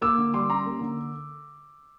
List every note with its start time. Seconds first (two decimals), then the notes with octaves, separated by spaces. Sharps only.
0.01 A#3 D6 E6
0.18 D3
0.34 G3 C6 D6
0.50 C#4 A#5 C6
0.66 A#3
0.81 D3